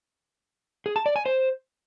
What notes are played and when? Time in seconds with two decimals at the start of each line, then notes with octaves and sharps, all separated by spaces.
0.86 G#4
0.96 A5
1.06 D5
1.16 G#5
1.26 C5